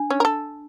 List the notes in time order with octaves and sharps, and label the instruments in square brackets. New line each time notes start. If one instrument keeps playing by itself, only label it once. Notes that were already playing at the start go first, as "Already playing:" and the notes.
Already playing: [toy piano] D4
[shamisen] C#4
A#4
A4